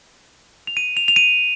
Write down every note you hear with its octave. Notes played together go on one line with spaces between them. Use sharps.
F7
D#7
F7
F7
D#7